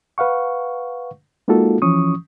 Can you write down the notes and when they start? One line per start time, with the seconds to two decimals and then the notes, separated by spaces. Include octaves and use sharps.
0.18 B4 F5 F#5 C#6
1.48 G#3 A#3 D#4 F4 F#4 A4
1.82 E3 F3 C#4 C#6 D#6